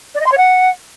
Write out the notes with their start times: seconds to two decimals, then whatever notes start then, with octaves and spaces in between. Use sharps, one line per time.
0.15 D5
0.20 D#5
0.26 C6
0.32 C#5
0.37 F#5